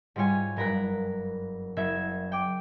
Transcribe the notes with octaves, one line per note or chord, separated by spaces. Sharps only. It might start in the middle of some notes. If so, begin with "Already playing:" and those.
G#2 G3 G#3 F4 C#5 G#5
F#1 G2 A#4 A#5 B5 F#6
F#1 E5 G#6
G5 D6